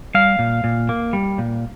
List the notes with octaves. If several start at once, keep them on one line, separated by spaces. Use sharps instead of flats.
G3 F5
A#2
A#2
A#3
G3
A#2